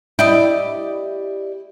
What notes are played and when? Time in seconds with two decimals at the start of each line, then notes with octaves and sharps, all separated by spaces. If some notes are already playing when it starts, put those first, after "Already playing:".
0.19 E4 G4 D5 D#5